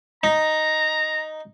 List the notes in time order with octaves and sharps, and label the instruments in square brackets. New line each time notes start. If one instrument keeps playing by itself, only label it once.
[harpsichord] D#4 [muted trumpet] A#5